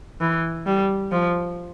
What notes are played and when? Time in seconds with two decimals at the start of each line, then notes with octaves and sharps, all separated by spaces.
0.21 E3
0.66 G3
1.12 F3